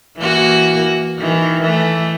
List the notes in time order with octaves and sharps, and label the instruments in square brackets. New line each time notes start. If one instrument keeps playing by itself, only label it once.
[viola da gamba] E3 A#3 F#4
D#3 E3
E3 A3